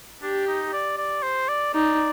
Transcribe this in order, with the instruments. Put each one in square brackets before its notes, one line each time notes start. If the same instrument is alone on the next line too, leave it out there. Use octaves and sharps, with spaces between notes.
[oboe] D4 [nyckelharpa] G4
[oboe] D#4
D5
D5
C5
D5
[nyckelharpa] D#4 [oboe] D5